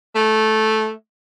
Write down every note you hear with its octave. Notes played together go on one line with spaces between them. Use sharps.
A3